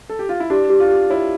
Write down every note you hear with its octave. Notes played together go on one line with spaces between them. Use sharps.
A4
G4
F4
E4
D4 G4
G4
F4
G4
E4 C#5